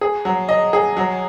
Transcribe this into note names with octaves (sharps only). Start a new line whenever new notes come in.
G#4
F#3
D#5
G#4
F#3